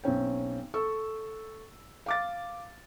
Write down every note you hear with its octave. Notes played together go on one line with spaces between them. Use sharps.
B1 C4 C#4 G5
A4 C#6 E6
F5 D6 A6